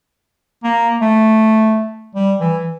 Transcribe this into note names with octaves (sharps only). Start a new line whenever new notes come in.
A#3
A3
G3
E3